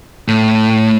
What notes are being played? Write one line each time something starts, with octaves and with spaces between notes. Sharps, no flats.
A2